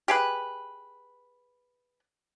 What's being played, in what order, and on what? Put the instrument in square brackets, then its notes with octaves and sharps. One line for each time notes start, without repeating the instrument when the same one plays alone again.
[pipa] G4 G#4 B4